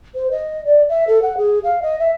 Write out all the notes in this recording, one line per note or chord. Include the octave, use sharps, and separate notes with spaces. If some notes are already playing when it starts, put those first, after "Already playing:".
C5
D#5
D5
E5
A4
F#5
G#4
F5
D#5
E5